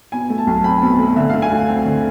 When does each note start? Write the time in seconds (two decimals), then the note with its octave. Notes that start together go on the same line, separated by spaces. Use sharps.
0.12 B2 G#5
0.30 A3
0.38 A5
0.47 B1
0.64 C4 B5
0.82 B2
0.99 A3
1.16 D3 E5
1.30 A3 F5
1.42 G#5
1.50 D2
1.68 C4
1.86 D3